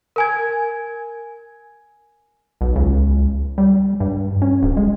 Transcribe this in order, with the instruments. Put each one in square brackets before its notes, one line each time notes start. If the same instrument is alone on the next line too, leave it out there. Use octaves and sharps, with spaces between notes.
[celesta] A#4 G#5 G#6
[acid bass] B1
C#2
G3
G2
C#4
D1
G#3